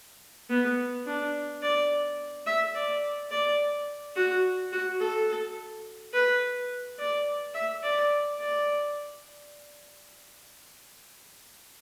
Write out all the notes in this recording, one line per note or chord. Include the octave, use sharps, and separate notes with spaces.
B3
D4
D5
E5
D5
D5
F#4
F#4
A4
B4
D5
E5
D5
D5